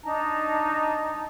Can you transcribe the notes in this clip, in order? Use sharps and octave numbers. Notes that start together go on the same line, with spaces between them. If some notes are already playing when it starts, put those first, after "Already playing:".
D4 D#4 A5 A#5